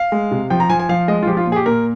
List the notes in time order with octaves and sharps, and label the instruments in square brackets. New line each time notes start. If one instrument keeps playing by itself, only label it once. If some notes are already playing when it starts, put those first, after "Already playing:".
Already playing: [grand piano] F5
G#3
C3
F3 G5
A#5
F3 G#5
G#5
F3 F5
G#3 D#5
F4
F3 G4
F4
A#2
G#4
G4
A#2 A#4